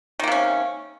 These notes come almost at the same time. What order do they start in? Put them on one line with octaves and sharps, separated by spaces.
D#3 A#3 C3 C#4